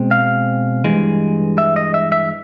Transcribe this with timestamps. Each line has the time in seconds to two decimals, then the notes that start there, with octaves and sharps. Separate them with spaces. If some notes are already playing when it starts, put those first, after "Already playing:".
Already playing: B2 G#3 C4
0.11 F5
0.84 G2 E3 G#3
1.58 E5
1.76 D#5
1.94 E5
2.12 E5